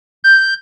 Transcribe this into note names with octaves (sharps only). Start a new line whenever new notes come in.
G6